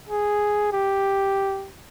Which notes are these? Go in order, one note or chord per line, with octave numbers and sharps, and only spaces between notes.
G#4
G4